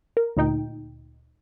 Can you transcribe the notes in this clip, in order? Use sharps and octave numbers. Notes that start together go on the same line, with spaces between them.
A#4
D2 A#2 D#4 G5